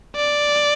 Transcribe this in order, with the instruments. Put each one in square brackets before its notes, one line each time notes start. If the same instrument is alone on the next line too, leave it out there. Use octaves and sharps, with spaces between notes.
[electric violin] D5